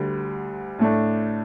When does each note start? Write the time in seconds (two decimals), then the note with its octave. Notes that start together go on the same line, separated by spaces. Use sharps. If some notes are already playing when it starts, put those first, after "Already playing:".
Already playing: D2 D3 G3
0.79 A2 A3 D4